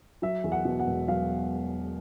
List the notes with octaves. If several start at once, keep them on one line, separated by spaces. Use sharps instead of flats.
F#3 E5
E2
F#5
B2
F#5
E1
F#3 F5